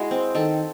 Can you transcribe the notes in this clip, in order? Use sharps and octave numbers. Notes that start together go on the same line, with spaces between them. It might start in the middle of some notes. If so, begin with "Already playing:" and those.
Already playing: G#3 E4 F#4 G#4
C4
D#3 A4